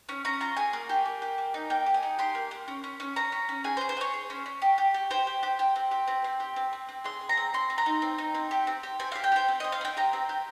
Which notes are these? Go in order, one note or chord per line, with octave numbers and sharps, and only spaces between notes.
C#4
C#4 A#5
F4 A#5
G#4 G#5
A#3
G4
A#3
G4
A#3
D#4
A#3 G5
G4
G#5
D#4
G4 C6
A#3
A#3
C#4
C#4
C#4
C#4 A#5
C#4
C#4
G#4 G#5
C5
G#4
C5
G#4 C#5
G#4
C#4
C#4
G4
G4
G4
G4 C5
G4
G4
G4
C4
G4
C4
C4
G4
C4
C4
C4
G#4 C6
G#4
A#5
C4
C4 C6
C4
A#5
D#4
C4
D#4
C4
G4
C4
G4
C4 G#5
G4 F5
G5
G4 C5
C4
C4 D#5
F5
C4 G5
G4 A#5
C4
G4